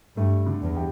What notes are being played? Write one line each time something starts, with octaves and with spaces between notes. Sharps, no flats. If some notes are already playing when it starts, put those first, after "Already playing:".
G2 A3
D3
E2
G4